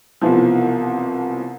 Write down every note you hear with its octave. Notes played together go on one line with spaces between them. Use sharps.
C2 B2 E3 F3